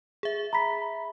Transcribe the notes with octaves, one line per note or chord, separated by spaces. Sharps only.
G#4 E5
A#5 B5 B6